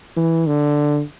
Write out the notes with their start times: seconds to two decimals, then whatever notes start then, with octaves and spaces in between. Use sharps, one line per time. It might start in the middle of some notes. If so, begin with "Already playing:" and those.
0.16 E3
0.46 D3